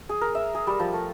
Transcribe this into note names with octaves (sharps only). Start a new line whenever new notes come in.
G#4
A#4
E5
G#4
G3
F3
A3